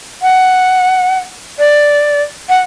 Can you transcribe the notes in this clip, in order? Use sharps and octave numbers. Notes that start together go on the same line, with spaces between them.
F#5
D5
F#5